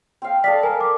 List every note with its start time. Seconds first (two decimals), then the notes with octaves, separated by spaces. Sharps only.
0.22 C4 F5
0.44 A4 D5 D#5 F5 B6
0.63 A#4 G#5 A#5
0.81 D6